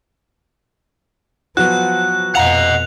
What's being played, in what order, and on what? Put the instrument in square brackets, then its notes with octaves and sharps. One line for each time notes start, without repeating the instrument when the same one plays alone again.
[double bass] F3 [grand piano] F#3 B3 F#4 [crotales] F#6
[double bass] F2 B2 [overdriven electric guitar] D#5 F#5 [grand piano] F5 A#5 [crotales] F7